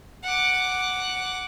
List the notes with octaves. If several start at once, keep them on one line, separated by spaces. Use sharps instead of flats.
F#5 D6